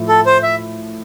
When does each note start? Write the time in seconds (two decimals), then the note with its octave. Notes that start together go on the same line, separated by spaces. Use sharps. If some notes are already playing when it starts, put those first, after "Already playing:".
Already playing: A2 F3 E4
0.08 A4
0.26 C5
0.43 E5